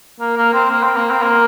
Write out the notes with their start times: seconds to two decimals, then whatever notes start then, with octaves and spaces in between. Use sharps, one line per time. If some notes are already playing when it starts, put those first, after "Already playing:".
0.20 A#3
0.37 A#3
0.54 C4
0.71 A#3
0.84 C4
0.96 A#3
1.11 C4
1.22 A#3